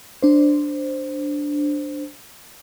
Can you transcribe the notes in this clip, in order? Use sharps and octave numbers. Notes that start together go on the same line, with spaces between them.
D4 C5